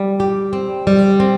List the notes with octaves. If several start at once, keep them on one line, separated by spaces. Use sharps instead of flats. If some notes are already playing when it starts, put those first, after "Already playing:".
Already playing: G3
G4
C4
G3
C4